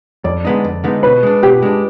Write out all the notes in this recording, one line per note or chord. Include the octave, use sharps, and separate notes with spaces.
F2 D5
D3 G#3 B3 D#4
F2
D3 G#3 B3 D#4
B2 B4
G#3 D4
B2 G4
G#3 D4